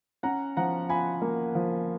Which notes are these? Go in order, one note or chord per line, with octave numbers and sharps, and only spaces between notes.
C#4 F#5 A#5
F3 F#5 A#5
F4 G#5 B5
A#3
F3